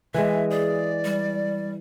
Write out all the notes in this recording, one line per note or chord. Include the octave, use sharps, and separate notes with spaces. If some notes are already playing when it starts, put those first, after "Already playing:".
E3 G#3 E5
G#4 D5
G3